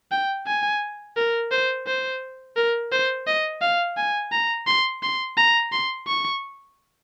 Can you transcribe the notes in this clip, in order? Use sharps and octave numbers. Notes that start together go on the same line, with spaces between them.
G5
G#5
A#4
C5
C5
A#4
C5
D#5
F5
G#5
A#5
C6
C6
A#5
C6
C#6